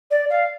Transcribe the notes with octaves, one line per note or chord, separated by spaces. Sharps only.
D5
F5